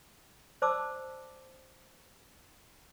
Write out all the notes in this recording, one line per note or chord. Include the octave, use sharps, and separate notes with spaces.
C5 D5 A5 D6 E6